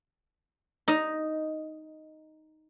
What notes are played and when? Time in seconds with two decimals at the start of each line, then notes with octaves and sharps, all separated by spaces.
0.88 D#4 D#5